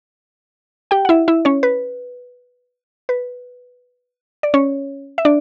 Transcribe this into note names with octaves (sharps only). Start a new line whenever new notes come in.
G4 G5
F#5
E4 E5
E4 E5
C#4 C#5
B4
B4
D5
C#4 C#5
E5
D4 D5